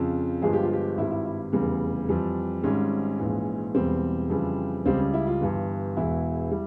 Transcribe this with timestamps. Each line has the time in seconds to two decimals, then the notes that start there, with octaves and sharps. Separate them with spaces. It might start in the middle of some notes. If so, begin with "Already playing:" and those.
Already playing: F2 C#3 F3
0.42 G1 G2 F3 G#3 G#4
0.53 G4
0.63 F4
0.73 G4
0.98 G#1 G2 G3 E4
1.11 E4
1.26 E4
1.53 F1 E2 C#3 G3
2.09 F2 E3 G3
2.63 G#1 G#2 G3 C#4
3.20 A#1 G#2 E3
3.75 E1 E2 E3 G3 C4
4.30 F2 C#3 E3 G3
4.85 C#2 C#3 G3 C4
4.99 C#4
5.13 E4
5.27 F4
5.41 G1 G2 E3
5.97 E1 E2 E3 E4
6.51 G3